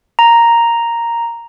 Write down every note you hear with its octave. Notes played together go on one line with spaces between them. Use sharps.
A#5